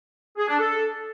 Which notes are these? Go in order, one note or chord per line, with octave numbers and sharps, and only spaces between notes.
G#4
D4
A4